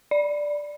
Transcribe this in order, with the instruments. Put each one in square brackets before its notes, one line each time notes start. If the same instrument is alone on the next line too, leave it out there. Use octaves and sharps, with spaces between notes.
[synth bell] D5